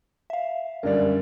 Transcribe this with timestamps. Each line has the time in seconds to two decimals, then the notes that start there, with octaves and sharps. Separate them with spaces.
0.30 E5 F5
0.83 F#2 D3 G3 A#4 D5